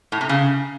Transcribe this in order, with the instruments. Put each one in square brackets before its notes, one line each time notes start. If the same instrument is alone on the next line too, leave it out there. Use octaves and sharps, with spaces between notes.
[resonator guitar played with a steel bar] A2
C3
C#3